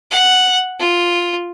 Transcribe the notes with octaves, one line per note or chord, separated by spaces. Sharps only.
F#5
F4